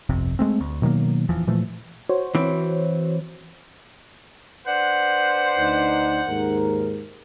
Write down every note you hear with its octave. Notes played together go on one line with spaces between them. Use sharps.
G1 C2 F2 C3
G#3 A3 C4
D2
B2 D#3 F#3 A#3
D#1 E2 E3 F3
A#2 E3 F3 A3
F#4 C5 C#5
E3 C4
D4 B4 C5 F#5
D2 D#4
D#2 G#2 A#4